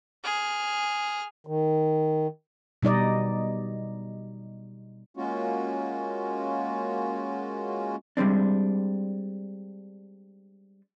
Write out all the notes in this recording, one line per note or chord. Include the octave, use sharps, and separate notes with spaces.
G#4 F6
D#3
B2 G3 D#4 D5 D#5
G#3 A#3 C#4 F4 F#4
G3 G#3 C4 D4